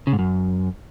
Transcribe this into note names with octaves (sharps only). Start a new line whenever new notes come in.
C#3
G#2
F#2